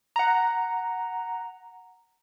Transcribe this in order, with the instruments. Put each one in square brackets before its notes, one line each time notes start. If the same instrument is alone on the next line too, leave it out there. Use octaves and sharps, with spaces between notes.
[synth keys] F#5 A#5